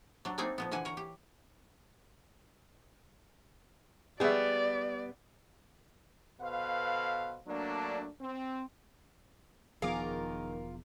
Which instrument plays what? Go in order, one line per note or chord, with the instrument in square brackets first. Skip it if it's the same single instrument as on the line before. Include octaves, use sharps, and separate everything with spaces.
[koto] F#3 D4
A3 A#3 C4 D#4 G#4 D5
A#2 F3 B3
D3 E3 F#5 G#5
A#4 C#5
G4
[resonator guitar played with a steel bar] G3 B3 [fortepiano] G#4 E5 [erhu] D5
[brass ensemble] B2 A4 B4 C5 F5
F#3 A3 A#3 D4
C4
[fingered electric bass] E1 F3 B3 [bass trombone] D#3 [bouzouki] F4 A#4 [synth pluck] G#4 D6